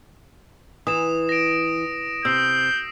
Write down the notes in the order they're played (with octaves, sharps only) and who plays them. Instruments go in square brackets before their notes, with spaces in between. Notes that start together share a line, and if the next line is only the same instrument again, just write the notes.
[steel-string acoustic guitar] E3 [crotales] D#6 E7
[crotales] A#6 D7
[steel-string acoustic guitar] C3 [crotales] E6 C7 [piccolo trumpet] G6